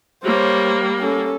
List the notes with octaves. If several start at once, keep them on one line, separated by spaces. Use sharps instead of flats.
G3 A#3 C5 C#5
C#4 A4